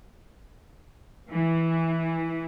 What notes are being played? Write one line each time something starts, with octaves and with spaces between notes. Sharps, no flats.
E3